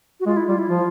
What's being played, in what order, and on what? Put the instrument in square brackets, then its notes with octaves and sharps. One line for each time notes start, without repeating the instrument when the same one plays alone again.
[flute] F#4
[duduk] G#3 [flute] F4
[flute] E4
[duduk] G3 [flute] F4
[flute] E4
[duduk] F3 [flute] F4